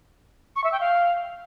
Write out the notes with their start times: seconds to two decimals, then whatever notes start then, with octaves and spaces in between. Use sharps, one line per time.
0.56 C#6
0.64 E5
0.72 G5
0.80 F5